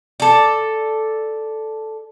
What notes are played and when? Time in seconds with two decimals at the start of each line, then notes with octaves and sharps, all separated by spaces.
0.20 A4 D5